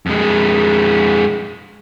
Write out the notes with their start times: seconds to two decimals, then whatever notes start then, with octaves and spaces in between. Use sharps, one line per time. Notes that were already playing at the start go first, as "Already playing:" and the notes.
0.06 F2 G#3